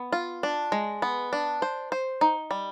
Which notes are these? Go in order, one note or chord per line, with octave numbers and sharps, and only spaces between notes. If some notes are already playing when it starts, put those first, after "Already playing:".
Already playing: B3
F4
D4
G#3
B3
D4
C5
C5
D#4
G3